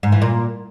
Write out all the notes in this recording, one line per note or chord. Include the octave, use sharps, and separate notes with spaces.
G#2
E3
A#2